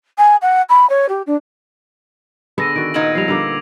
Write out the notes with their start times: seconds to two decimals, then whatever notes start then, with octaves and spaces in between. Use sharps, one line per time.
0.18 G#5
0.42 F#5
0.69 B5
0.90 C#5
1.09 G4
1.27 D4
2.58 D3 B3 G#4 A4 E6 A#6 D#7
2.76 D#3 F#4 D7
2.94 A#2 B3 D#4 G#6 F#7
3.15 F3 G3 C7 F7
3.28 D3 G3 A#3 D6 F7